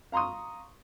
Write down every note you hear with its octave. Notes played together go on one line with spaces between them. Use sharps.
F5 A#5 C6 C#6 D#6